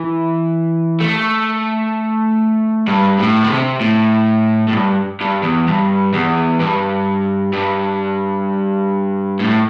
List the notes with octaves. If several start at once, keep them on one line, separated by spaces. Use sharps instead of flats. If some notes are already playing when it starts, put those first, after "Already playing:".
Already playing: E3
A3
G2
A2
D3
C3
A2
A2
G2
G2
E2
G2
E2
G2
G2
A2